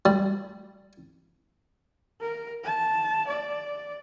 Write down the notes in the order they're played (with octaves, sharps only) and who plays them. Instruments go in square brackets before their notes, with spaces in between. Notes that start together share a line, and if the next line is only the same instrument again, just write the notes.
[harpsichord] G3
[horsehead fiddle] A#4
A5
D5